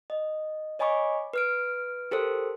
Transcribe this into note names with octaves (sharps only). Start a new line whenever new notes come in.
D#5
C#5 D#5 G#5 B5 C#6 D6
B4 F6 D7
G4 A4 A#4 C5